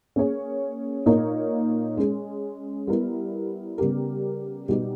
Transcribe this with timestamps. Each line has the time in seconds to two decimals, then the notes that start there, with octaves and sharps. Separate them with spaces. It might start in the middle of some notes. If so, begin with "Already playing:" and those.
0.16 A#3 C#4 G#4 C#5
1.06 A#2 A#3 D#4 A#4 C#5
1.97 G#3 C#4 G#4
2.87 G3 B3 E4 A#4
3.78 C#3 G3 B3 G4 A#4
4.69 B2 G3 B3 D#4 G4